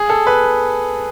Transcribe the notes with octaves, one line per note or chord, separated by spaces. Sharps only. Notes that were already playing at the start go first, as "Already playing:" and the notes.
Already playing: G#4
A4
B4